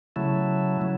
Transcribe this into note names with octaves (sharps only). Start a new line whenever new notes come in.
C#3 F#3 A3 E4
C#3 F#3